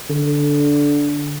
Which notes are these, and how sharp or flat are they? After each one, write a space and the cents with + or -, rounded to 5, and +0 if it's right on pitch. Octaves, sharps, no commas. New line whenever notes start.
D3 -10